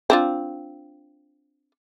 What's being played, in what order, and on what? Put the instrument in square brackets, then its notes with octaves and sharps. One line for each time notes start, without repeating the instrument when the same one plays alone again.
[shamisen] C4 D4 F4